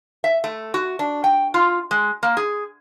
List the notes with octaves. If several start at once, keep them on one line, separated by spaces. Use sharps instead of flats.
E5
A3
F#4
D4
G5
F4
G#3
A#3
G#4